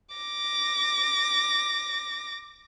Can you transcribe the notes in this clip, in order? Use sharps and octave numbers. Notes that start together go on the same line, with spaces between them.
D6 A#6